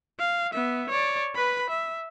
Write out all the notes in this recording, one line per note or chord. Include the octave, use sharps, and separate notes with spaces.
F5
B3 E5
C#5 D5
B4 B5
E5